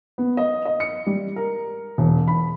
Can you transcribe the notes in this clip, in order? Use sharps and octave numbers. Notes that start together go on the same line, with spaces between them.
B3
D#5
D#5
C#7
G3
A#4
E1
B5